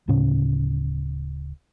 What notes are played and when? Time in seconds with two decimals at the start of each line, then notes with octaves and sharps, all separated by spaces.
0.08 D1 A2 C#3 C#4